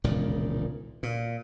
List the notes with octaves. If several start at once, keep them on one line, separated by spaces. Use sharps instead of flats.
E1 C#2 A#2 D#3
A#2